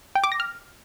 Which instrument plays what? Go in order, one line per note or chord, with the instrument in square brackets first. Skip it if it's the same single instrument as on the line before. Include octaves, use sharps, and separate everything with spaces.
[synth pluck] G5
D6
A#6
F6